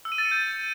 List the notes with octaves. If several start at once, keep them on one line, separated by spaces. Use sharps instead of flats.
E6
D#7
A6
C#7
G6